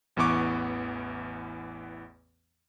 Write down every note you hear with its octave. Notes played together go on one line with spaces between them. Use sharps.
A1 E2 E3 B3 C#6 D6